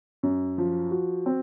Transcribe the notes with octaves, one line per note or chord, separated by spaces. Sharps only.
F#2
F3
F#4
C4